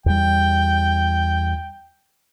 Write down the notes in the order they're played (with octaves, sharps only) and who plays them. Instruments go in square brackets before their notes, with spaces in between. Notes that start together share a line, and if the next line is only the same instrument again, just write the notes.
[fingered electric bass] E2 G3 [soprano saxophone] G5